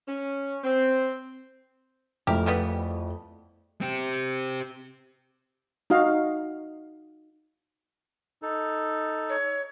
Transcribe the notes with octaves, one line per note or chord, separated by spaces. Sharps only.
C#4
C4
F2 A3 E4 G4 A#4
C#3 G3 B3
C4 G4
D#4 F#4 D#5 F5
D#4 A4
C#5